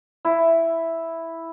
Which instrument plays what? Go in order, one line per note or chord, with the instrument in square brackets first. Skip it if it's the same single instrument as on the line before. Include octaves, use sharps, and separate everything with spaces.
[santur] E4